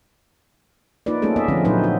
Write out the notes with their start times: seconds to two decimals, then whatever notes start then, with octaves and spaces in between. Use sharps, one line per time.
1.06 A#3 D#4 F4 B4 D5
1.22 A3 A#3 C#4 G#4 A4
1.36 B3 D#5 E5
1.48 D3 F3 A3 C4 C#4
1.65 A#2 F#3 A3 D#4 B4 C5
1.84 F#4